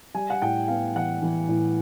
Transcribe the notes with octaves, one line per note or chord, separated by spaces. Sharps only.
G3 G#5
F#5
A2 G5
B3 F5
E3 F#5
E3
A2